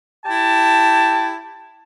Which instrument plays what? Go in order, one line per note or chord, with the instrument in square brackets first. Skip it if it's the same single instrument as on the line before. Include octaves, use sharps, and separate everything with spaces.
[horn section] E4 G4 A5